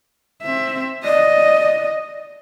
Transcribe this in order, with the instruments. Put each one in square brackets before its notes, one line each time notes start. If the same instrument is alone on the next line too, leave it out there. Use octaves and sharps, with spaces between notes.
[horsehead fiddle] C4 E5
[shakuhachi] D5 [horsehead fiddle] D#5